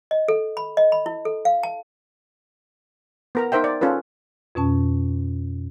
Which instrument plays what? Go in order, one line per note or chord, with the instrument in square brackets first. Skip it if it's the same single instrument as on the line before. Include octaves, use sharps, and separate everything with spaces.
[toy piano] D#5
A4
B5
D#5
B5
E4
A4
F5
A5
[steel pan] B3 A#4 A#5
D#4 A#4 C5 E5 G5
D5
C#4 F4 A4 B4
[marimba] F2 B2 C#4 A5